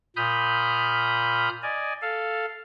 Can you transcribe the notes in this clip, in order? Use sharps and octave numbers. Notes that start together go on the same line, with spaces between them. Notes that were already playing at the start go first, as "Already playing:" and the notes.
A#2 B5 D#6 F6 G6
D5 D#5 G#5
A4 F5